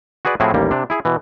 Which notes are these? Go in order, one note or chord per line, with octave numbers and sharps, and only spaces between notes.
F#4 G#4 B4 D5
A2 F3 C4 E4 F#4 G#4
A1 D#2 G3 A#3
C3 D4
E4 G#4
B2 E3